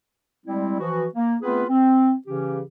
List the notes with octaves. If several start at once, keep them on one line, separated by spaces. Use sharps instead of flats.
G3 G#3 C4 E4
E3 F3 F#4
A#3
A3 B3 C4 F4 G#4 B4
C4
C#3 E3 C#4 G4